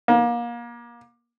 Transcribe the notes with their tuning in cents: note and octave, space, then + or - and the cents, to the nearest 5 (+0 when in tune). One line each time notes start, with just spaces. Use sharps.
A#3 +30